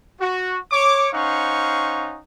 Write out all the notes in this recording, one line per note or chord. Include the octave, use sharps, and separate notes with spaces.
F#4
C#5 D6
C#4 D#4 C5 F5 F#5 C#6